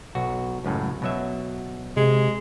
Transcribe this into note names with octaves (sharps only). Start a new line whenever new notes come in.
B1 F#4
C#2 F#2 A2
B2 F#3 E5
C3 G#3